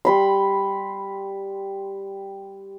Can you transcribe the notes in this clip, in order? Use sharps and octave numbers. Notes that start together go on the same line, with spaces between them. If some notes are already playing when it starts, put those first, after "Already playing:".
G3 B5 C6